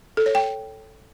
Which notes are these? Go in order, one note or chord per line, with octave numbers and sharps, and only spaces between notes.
A4
C#5
G5